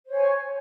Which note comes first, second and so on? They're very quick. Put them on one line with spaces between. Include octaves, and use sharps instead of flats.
C5 C#5 G#5 C#6